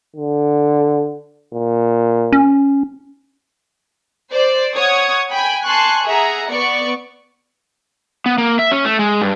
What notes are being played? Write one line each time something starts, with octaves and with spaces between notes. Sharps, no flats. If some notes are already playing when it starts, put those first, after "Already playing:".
D3
A#2
C#4
C5 D5
C#5 F#5 C#6 D#6 G#6
G5 G#5 B5
G#5 A5 C6 C#6 F#6
G#4 E5 F#5 A#5
B3 D5 C#6 C#7
B3
A#3
E5
C#4
A3
G#3
G2